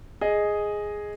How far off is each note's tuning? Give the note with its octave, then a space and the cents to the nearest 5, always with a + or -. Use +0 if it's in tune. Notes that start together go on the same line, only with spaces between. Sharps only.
G#4 +0 D#5 +0